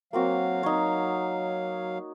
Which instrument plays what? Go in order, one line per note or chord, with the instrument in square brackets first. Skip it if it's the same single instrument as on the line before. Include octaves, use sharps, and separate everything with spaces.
[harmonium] F#3 F5 [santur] A#3 C4 F#4
[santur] D#4 C#5